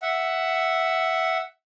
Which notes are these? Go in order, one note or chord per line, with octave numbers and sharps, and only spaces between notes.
E5 F#5